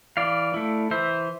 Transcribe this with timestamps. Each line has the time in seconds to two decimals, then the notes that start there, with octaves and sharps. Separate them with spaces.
0.17 E3 D5 F5
0.54 A3 E4
0.91 E3 C5 E5